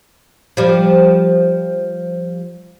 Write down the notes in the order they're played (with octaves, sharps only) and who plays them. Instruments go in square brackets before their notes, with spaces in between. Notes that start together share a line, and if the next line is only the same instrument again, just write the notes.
[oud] F3 G3